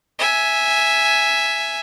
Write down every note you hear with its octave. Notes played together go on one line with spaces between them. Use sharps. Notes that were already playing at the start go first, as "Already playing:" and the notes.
E5 G#5